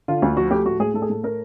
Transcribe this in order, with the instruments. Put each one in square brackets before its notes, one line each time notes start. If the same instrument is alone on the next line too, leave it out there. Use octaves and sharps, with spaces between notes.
[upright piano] D3 F4
D2
F3 F#4
A3 G4
A2 F#4
A2 G#4
A2 A4
G#4
A2 A4
A3 A#4